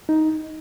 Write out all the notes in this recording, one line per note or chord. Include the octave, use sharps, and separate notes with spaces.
D#4